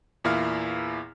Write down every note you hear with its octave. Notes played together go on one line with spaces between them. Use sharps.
E2 A#2 E4 F5 F6